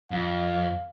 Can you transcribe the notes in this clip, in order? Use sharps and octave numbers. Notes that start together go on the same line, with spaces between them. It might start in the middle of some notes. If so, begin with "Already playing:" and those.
F2 F5